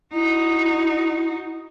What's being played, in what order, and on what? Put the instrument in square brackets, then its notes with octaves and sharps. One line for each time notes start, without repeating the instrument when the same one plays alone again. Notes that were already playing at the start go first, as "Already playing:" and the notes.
[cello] D#4 F#4 [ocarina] E4